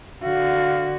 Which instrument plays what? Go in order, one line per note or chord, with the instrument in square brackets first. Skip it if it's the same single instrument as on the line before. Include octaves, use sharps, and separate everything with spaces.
[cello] D3 F#4 [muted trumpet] F5